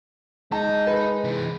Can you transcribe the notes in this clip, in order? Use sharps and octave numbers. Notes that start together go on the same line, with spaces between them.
G#3 D#4 A5
B4
C3 E3